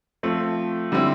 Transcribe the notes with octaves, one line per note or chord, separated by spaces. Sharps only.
F3 A3 C4
D3 G3 C4 E4